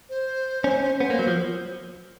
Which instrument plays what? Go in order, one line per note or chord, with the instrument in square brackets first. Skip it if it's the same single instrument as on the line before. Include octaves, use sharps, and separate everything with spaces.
[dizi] C5
[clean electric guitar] C#4
[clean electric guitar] B3 [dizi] C5
[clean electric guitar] A#3
F#3
F3